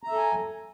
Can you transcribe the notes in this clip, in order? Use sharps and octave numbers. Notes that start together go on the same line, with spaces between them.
A4 E5 G#5 A#5